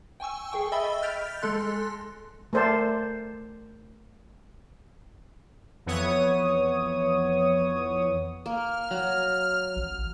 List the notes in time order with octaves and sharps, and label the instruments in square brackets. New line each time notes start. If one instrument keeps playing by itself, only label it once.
[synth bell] G5 G#5 C#6 E6
G#4 A4 G5 C#6
D#5 E5 G5 B5 E6 A6
F6 G6 A6 B6 D7 F7
G#3 A4 C6 F#6
[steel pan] A3 A#4 C5 D5 A5
[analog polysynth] F2 E3 B3 C#5 D#6
[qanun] A#3 [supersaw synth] F6
[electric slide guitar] F#3
[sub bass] A1